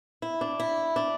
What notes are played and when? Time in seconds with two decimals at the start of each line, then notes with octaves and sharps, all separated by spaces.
0.22 E4
0.41 D4
0.60 E4
0.96 D4